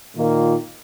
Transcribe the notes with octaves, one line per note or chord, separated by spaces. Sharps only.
A#2 D#3 A#3 F4